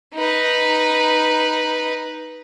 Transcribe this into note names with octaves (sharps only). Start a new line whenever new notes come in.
D#4 B4